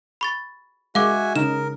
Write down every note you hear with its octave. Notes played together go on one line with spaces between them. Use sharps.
B5 C#6 A6
G#3 F#4 E5 F5 G#5 D6
C#3 D#4 A#4 E7